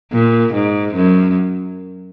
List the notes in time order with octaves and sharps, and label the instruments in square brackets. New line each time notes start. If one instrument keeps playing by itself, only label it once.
[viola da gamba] A#2
G#2
F#2